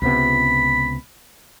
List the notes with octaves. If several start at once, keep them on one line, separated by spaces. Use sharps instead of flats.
C#2 C3 B3 B5